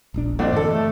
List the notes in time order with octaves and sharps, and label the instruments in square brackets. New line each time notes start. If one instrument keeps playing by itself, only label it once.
[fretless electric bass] D#1 A#1 D4 [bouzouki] A#5
[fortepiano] A#1 C4 D5 [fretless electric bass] A#3 [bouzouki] D4 D#4 D#5
[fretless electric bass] G2 D3 E3 [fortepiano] A4 D5
[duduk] A3 [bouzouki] D4 G4